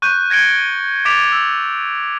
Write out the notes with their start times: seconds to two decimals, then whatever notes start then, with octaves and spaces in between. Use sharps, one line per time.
0.02 C#6 F#6 G6 D#7
0.30 G#6 A#6 C#7 D7 G7
1.05 D6 A6 B6 D7 F7
1.32 E6